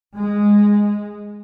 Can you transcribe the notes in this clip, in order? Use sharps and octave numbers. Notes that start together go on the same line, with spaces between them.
G#3